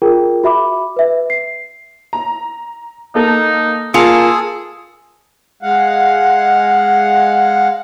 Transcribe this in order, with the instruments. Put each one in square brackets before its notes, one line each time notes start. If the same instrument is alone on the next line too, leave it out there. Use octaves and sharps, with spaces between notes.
[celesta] F4 G#4 A#4 G5
F#4 E5 B5 D6
B4 E5
C7
[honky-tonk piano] A#5
[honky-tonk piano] A#3 A4 [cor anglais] D#4
[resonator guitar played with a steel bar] A#3 F4 [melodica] G#4 [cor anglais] A4 [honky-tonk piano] C#7
[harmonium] G#3 F5 F#5